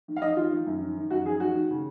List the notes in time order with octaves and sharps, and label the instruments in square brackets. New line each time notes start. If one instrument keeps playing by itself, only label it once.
[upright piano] D#3
F5
D#3 D#5
D#3 F4
D#3
F#2
D#3
D#3
F#2 F#4
D#3 G#4
D#3 F#4
D#3
C#3